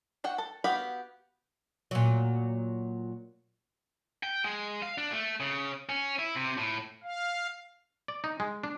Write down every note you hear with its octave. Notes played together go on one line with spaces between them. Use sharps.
F#4 F#5 G5
A4
B3 F#4 G4 F5 B5
A#2 F#3
G5
G#3
F5
D4
A3
C#3
C#4
E4
C3
A2
F5
D5
D#4
G#3
D4